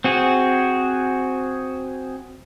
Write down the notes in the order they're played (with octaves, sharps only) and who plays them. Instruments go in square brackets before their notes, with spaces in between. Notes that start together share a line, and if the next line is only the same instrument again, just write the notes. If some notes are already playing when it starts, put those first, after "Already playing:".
[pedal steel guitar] C4 F#4 G#4